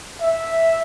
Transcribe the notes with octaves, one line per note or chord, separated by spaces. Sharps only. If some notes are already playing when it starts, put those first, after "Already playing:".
E5